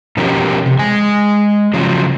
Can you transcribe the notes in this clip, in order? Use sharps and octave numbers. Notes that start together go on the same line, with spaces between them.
B2 F3 C#4 D#4 G4 A#4
C3
G#3 G#5
C#3 F3 F#3